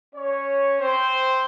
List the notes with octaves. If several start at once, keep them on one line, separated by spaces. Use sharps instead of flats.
C#4 C#5
C4 C5